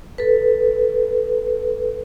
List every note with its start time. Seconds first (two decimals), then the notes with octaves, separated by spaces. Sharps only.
0.18 A4 B4